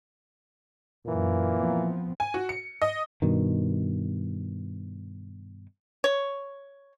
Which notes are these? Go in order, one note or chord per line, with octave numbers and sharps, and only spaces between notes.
F#2 A#2 E3 A#3
F3 B3 C4
G#5
F#4
C#7
D#5
G2 B2 D#3
C#5